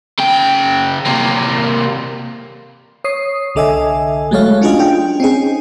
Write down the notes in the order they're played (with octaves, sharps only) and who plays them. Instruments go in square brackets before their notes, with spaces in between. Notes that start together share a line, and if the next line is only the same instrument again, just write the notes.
[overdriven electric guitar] C#3 G5
C3 A#3
[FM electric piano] C#5 D#6 C7
C2 D3 A4 D#5 E5 G#5
F#3 G#3 A3 A4 C#5 F5
C#4 D4 F4 F#4 G#4 D#5
D4 F4 G5
C4 C#4 D#4 G#4